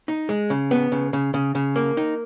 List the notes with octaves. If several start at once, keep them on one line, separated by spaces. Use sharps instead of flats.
D#4
G#3
C#3
B3
C#3
C#3
C#3
C#3
A#3
D#4